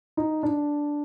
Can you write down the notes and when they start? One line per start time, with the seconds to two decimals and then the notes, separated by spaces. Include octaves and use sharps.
0.17 D#4
0.43 D4